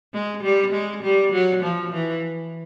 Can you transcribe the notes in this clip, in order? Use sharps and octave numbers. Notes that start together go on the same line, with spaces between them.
G#3
G3
G#3
G3
F#3
F3
E3